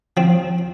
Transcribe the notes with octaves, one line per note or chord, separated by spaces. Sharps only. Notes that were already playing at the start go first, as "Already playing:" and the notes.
F3 C4